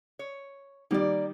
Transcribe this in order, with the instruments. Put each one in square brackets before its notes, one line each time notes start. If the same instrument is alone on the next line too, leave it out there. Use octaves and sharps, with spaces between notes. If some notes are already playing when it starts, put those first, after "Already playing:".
[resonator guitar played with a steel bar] C#5
[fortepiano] D#3 G3 [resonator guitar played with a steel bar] A#3 D5